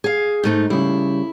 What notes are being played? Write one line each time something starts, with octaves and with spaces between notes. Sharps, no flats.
G#4 F5
G#2 A3 D#4
C#3 G3 E4